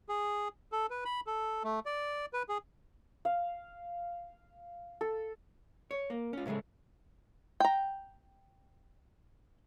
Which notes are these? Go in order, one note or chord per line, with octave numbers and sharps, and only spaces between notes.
G#4
A4
B4
B5
A4
A3
D5
B4
G#4
F5
A4
C#5
A#3
C#4 F4
A2 C#3 E3 G#3 A3
G5 A#5